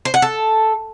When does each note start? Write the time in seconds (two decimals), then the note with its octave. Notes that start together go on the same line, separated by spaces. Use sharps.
0.05 C5
0.14 F#5
0.22 A4